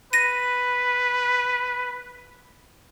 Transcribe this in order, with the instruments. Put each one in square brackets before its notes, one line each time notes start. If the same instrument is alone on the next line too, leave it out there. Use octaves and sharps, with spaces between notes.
[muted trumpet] B4 [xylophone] A#6 D#7